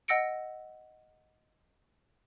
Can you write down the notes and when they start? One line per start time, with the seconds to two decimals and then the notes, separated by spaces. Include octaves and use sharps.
0.08 D#5 F#5 E6 A#6 C#7 D7